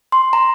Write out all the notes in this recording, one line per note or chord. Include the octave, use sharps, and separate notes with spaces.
C6
A#5